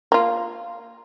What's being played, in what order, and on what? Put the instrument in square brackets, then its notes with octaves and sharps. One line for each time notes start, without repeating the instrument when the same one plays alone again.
[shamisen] A#3 F4